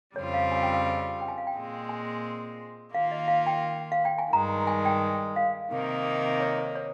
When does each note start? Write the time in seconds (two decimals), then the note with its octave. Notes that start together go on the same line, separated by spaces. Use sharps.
0.16 F2 C#3 G3 C4 F4 C#5
0.34 F5
0.52 G#5
0.57 F5
0.63 G5
0.74 F5
0.86 F5
1.21 G5
1.28 G#5
1.38 F5
1.47 G5
1.55 A#2 G#3 C4
1.89 G#5
2.94 D#3 A#3 F4 F5
3.12 D#5
3.28 F5
3.47 G5
3.92 F5
4.05 G5
4.18 G#5
4.33 G2 D#3 G#3 A#5
4.67 G#5
4.85 G5
5.36 F5
5.72 C3 D#3 A#3 D#4
6.40 C#5
6.58 C5
6.76 C#5